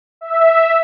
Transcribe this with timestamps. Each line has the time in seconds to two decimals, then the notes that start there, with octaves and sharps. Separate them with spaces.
0.21 E5